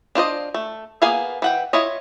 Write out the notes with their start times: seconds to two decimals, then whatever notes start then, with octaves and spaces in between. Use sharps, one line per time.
0.15 D4 F4 C5 D#5
0.54 A3
1.02 A#3 B3 G#4 F5 G#5
1.42 E3 F#5 G5
1.73 E4 F4 C#5 D#5